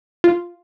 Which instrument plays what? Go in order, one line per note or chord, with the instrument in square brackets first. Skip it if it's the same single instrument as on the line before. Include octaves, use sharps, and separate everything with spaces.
[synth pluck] F4